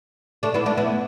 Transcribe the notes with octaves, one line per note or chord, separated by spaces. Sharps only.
A3 D4
B3 E4
A3 D4
B3 E4